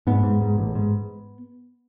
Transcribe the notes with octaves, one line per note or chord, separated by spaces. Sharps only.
G#2 B3
G#2
G#2
A1
G#2